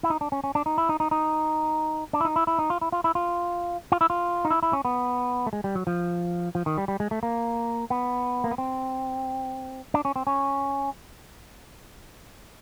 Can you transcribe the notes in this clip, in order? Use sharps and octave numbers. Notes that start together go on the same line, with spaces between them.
E4
D#4
D4
C#4
C#4
D4
D#4
E4
D#4
D#4
D#4
D4
E4
D#4
E4
E4
D#4
F4
E4
F4
E4
F4
F4
E4
F4
D#4
E4
E4
C#4
B3
A3
G#3
G3
F#3
F3
F3
D#3
G3
G3
G#3
A3
A#3
B3
A#3
B3
C4
D4
C#4
C4
C#4